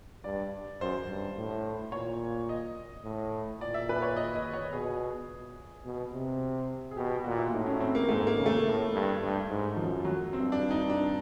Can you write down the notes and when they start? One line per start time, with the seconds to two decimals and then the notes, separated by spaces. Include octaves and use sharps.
0.24 G2 D5
0.80 F#2 C5
1.09 G2
1.37 A2
1.92 A#2 C#5
2.49 D#5
3.04 A2
3.61 A#2 D5
3.74 E5
3.89 B4
4.02 C#5
4.16 D#5
4.35 D#5
4.53 C#5
4.73 B2 G#4
5.85 B2
6.13 C3
6.91 G#4
6.97 B2 G4
7.10 G4
7.24 A#2 F#4
7.38 E4
7.53 A2 D#4
7.66 C#4
7.80 C4
7.95 A#3
8.09 G#2 A3
8.27 A#3
8.37 C#3
8.46 A3
8.65 A2
8.92 G2
9.21 G2
9.49 G#2
9.76 F#2 F3
10.05 F#3
10.33 G2 C4
10.52 D4
10.70 D#4
10.89 D4